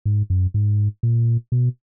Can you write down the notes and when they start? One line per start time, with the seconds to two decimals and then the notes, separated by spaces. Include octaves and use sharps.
0.06 G#2
0.30 F#2
0.54 G#2
1.03 A#2
1.52 B2